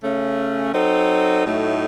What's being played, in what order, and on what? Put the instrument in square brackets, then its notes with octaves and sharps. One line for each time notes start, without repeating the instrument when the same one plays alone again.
[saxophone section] C#3 A3 C#4
F#3 C4 D#4 A4
A2 F#3 A3 D#4